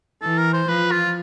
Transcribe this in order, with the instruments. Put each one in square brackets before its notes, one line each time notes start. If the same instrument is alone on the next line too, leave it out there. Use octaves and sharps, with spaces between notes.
[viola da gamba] E3 [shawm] A4
[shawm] A#4
C5
[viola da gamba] F3 [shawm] B4
[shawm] F4